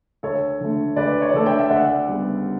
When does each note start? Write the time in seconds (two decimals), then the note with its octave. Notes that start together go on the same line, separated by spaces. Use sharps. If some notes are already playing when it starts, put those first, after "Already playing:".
0.23 D2 A4 C#5
0.61 D3 A3
0.96 D2 B4 D5
1.22 C#5
1.29 D5
1.34 D3 A3 A4 C#5
1.46 E5 G5
1.59 E5
1.70 D2 D5 F#5
2.07 C#3 G3 B3